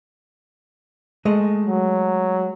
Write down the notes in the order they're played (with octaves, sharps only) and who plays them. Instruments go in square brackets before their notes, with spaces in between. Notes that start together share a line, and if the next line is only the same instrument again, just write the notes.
[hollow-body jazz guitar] G#3 A3 D#5
[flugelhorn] F#3